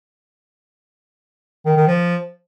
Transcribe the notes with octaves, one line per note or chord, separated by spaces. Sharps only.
D#3
D#3
F3